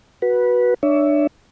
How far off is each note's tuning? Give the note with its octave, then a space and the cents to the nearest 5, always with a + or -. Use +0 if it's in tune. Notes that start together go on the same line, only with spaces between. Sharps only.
F#4 +0 B4 -15
D4 +20 C#5 +30 E5 +0